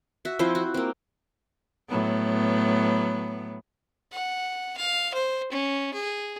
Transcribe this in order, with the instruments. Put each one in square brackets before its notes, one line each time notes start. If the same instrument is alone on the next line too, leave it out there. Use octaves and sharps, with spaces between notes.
[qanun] F#4 E5
F3 C4 E4 C5
F#4
A#3 C4
[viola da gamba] A2 F#3 B3
[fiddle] F#5
F5
C5
C#4
G#4